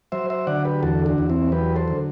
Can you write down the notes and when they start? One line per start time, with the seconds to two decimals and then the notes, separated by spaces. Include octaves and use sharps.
0.12 F#3 C5 E5
0.30 C5 E5
0.47 D3 D5 F#5
0.65 G4 B4
0.83 E2 F#4 A4
1.06 D4 F#4
1.18 E2
1.29 C4 E4
1.52 F#3 G4 B4
1.75 A4 C5
1.88 D3